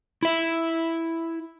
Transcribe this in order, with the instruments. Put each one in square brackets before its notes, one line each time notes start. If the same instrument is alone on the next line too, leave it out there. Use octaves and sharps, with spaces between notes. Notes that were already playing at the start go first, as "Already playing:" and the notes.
[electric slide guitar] E4 E5